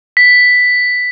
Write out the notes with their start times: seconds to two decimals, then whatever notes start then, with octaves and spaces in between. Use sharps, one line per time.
0.17 B6